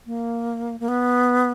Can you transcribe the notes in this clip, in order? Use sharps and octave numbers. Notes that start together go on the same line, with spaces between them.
A#3
A#3
B3